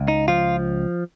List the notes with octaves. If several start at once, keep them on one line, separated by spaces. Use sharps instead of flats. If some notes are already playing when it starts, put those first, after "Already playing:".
Already playing: C#2
D#4
F3 F4